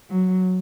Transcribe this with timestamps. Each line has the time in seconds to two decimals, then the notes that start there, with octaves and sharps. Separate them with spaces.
0.10 F#3